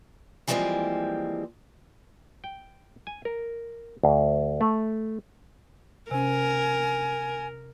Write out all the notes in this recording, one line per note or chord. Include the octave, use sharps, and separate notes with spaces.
E3 F3 G3 G#3 A#3 C4
G5
G#5
A#4
D2
A3
C3 C#4 A#4 G#5